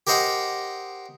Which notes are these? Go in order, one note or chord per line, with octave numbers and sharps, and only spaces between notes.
G4 A#4 C5 D#5 F#5 G5